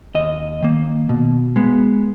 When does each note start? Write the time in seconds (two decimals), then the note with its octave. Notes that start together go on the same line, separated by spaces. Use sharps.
0.15 D#2 D#5
0.62 D#3 A#3
1.09 B2
1.56 G#3 B3